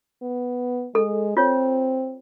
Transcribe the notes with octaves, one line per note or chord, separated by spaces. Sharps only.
B3
G#3 A4
C4 F4 C#5